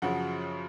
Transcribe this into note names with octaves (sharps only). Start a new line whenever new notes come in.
F#2 C#3 F3 F#4